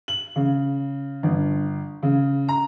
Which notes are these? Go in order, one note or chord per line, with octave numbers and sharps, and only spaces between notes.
F#7
C#3
G1
C#3
A#5